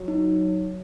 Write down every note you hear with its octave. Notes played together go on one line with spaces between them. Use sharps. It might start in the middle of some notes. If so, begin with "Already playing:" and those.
Already playing: F#3
D#4